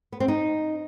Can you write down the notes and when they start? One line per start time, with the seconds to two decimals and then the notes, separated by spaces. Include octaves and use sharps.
0.12 B3
0.20 C4
0.28 D#4